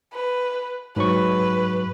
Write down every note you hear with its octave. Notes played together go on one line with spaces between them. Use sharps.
B4
G#2 F#3 B4 C#6